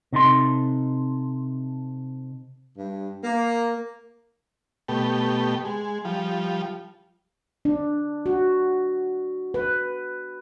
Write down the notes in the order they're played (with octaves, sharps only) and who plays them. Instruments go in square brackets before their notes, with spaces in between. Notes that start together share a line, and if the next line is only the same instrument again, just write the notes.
[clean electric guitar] C3 D#4 A4 C6
[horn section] G2
A#3
[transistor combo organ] B2 A3 G4
G#3
F3 G3
[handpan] D4
F#4
B4